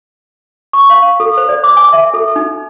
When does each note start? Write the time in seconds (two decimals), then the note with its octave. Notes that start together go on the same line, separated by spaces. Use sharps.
0.73 C#6
0.90 F5
1.20 A4
1.37 C5
1.49 D5
1.64 D6
1.77 G#5
1.93 E5
2.14 A4
2.36 D#4